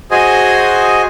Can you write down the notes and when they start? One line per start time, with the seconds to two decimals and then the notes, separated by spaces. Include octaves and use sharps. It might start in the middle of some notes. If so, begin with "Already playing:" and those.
0.11 F#4 G#4 C5 D#5 G#5